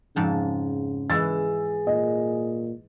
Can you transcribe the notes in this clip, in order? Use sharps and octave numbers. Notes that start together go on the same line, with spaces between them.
F2 G#2 C#3 A5
E3 G#3 E4 G#4 E6 A6
A#2 D#5